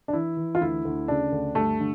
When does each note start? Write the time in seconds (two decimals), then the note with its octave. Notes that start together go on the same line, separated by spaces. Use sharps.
0.08 D4
0.13 E3 E4
0.37 E3
0.55 F4
0.61 D2 E4
0.85 D2
1.08 C#3 D4
1.32 D2
1.55 G2 A3
1.80 D3